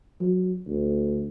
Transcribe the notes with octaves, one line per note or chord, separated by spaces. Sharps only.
F#3
D2